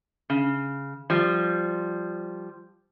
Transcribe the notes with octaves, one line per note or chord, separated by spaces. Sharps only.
C#3
F3 G3